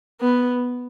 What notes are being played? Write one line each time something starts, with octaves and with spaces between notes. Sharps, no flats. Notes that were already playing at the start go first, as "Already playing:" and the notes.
B3